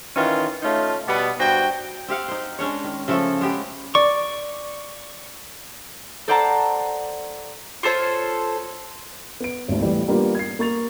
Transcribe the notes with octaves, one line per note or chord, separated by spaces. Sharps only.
D#3 E3 C#4 F4
A3 C#4 D#4 F4
B2 G3 B3
G2 F#4 C5 G5
C4 G4 F5 F#5
D#4 C5
G#3 C#4 D4 C#5
D#3
C#3 F3 A3 A4
G#3 B3 G4
D5 C#6
A4 C5 D5 F#5 A5 A#5
F4 A4 C5 C#5
B3 D7
G#1 D2
A2 E3 G3 B3
G3 A#3 B3 D4 F4 G4
G#6 C7
A#3 C#6 A6 F7